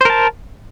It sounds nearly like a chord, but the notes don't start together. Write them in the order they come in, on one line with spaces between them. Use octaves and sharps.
C5 A#4 A5